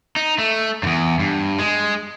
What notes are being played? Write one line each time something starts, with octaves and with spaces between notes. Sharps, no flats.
D#4
A3
E2 G2
G2
G#3